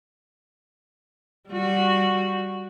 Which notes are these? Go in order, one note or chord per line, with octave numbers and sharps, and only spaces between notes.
G3 F#4